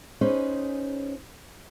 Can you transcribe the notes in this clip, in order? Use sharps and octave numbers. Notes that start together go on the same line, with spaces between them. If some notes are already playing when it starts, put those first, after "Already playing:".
C#4 D#4 G#4 B4 C5